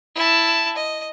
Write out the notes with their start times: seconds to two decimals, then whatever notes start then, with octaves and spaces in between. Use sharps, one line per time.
0.16 E4 A5
0.77 D#5